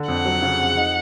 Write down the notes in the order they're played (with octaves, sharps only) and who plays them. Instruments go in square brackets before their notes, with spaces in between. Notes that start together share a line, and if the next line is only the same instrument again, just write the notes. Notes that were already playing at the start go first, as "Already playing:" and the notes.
Already playing: [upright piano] D3
[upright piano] F2 [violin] F#5
[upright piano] F#3
C#3
F2
D#4